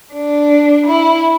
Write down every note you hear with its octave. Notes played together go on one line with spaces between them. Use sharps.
D4
E4